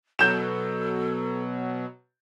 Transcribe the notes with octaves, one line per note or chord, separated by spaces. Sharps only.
B2 F#3 A4 G6 E7